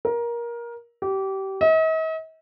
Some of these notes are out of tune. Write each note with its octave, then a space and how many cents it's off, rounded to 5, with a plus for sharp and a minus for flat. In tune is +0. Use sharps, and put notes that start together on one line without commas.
A#4 +20
G4 -25
D#5 +45